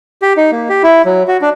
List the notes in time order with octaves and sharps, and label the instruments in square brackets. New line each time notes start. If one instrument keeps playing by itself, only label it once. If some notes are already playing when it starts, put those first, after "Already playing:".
[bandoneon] G4
D#4
A#3
G4
E4
F#3
F#4
D4